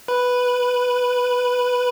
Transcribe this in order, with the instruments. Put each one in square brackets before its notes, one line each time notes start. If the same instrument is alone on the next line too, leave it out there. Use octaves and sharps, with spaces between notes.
[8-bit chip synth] B4 B5